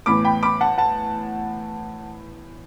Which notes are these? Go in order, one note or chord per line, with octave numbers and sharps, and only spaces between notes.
A2 E3 B3 B5 D6
G5 B5
B5 D6
F#5 A5
F#5 A5